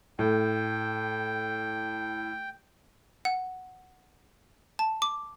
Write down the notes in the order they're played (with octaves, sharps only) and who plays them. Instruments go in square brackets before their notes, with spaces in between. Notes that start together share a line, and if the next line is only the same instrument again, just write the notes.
[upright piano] A2 [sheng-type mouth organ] G5
[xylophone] F#5
A5
D6